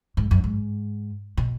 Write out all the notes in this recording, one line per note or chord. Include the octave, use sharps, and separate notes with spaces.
G#2
F#2
G#2
B2